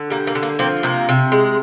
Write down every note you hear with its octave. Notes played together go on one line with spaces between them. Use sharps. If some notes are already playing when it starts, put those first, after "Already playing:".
Already playing: D3
G3 A#3
A#3
D3
A#3
F3 A#3 C4
C3 A#3
C3
G#3